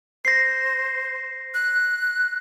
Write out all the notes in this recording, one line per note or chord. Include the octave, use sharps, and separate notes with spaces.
C5 A#6 C7
F#6